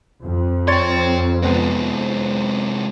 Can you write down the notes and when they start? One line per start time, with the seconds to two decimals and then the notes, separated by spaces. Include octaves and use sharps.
0.22 F2
0.68 C#5 G5 C6 A6
1.43 C3 G#3 B3 C4